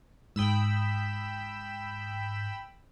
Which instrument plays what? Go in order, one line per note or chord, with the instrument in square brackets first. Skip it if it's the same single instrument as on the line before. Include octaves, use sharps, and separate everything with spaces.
[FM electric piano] G#2 D#6 [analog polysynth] G5 B5 E6